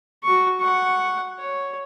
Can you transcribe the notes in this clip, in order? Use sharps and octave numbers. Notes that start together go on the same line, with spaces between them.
F#4 C#6
F#5 C#6
C#5